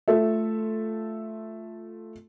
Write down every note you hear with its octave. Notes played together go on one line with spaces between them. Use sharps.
A3 F4 A4 E5